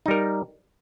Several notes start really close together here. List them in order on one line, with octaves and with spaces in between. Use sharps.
D#4 G3 A#4